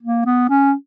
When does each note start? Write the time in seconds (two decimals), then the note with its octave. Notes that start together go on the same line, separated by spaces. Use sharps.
0.03 A#3
0.25 B3
0.49 C#4